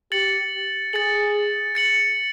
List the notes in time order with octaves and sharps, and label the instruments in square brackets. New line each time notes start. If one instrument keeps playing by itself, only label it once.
[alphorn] G4 [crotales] A6 C#7 F#7
[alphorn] G#4 [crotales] A6 C#7 F#7
[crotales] A6 C#7 F#7